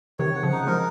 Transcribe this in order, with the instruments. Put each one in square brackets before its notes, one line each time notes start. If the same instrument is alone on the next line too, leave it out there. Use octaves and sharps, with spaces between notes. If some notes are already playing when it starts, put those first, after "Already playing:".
[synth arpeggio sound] C3 D#3 [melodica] C#5
[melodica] F#5
[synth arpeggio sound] C#3 F3
[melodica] D#4
[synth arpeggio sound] F3 G#3 [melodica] A#4